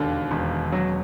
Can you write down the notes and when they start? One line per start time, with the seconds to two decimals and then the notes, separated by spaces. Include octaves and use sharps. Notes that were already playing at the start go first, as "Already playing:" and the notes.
Already playing: E1 D#2 D3
0.31 E1
0.72 F#3